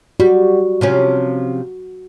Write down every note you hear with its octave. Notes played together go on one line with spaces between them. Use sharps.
G3 F#4
C3 F3 C#4